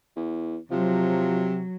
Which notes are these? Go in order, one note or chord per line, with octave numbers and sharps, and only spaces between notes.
E2
C3 F3 F#3